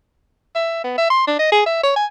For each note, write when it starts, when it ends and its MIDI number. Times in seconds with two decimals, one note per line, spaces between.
0.55 0.83 76
0.84 0.98 59
0.98 1.06 76
1.10 1.23 84
1.27 1.35 62
1.39 1.51 75
1.52 1.62 68
1.66 1.79 76
1.83 1.92 73
1.96 2.06 80